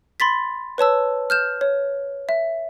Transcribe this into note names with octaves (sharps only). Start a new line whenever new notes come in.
B5 C6 A6 B6
B4 C#5 A5 E6
F6 G6 E7
C#5
E5